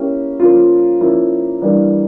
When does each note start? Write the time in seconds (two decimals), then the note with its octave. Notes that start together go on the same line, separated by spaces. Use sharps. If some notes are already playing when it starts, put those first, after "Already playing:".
Already playing: A#3 C#4 E4 G4
0.40 F3 A#3 C#4 F4
1.01 F3 A#3 C#4 E4
1.62 E3 G3 A#3 D4